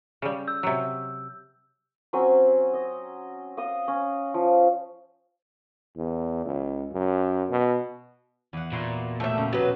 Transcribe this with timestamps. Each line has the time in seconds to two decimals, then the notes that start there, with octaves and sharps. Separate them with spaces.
0.22 C#3 G3
0.48 E6 G6
0.63 C3 F#3
2.13 F#3 C4 C#4 G#5
2.74 D#5
3.57 D#5 F5 D#6
3.88 C#4
4.34 F3
5.97 E2
6.46 C#2
6.93 F#2
7.50 B2
8.53 E2 F#5
8.72 A#2 E4 F#4 C6
9.20 A3 F#4 G4 E5
9.37 C#3
9.53 B2 F#3 B4